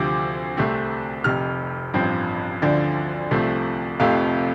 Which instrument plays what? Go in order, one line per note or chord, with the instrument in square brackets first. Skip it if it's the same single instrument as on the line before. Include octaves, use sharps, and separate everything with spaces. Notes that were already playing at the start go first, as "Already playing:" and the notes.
Already playing: [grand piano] D2 C3 F3 C4 D6
C2 C3 A3 C4
F1 F2 C3 F6
A1 G2 F3 C4
D2 D3 F3 D5
C2 C3 F3 A3
F1 F2 C3 F3 A3 F5